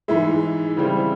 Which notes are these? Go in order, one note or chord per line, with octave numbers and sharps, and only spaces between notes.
G#2 E3 G#3 E5
C#3 E3 G3 C4